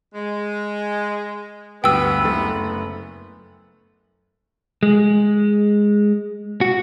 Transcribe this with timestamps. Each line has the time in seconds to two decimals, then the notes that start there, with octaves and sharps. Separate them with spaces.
0.15 G#3
1.84 D2 G2 B3 G5 E6
2.24 F#1 A3 A6
4.83 G#3
6.61 F#4